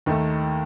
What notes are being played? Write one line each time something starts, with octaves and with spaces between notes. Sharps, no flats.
D#2 D#3 A3